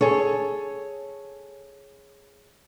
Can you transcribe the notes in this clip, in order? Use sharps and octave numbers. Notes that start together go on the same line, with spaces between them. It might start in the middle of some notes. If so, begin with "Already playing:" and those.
G#4 A4 C#5